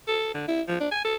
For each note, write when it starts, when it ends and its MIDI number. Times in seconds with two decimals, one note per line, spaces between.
0.08 0.31 69
0.34 0.48 50
0.48 0.61 64
0.68 0.80 53
0.80 0.91 62
0.91 1.04 80
1.05 1.16 69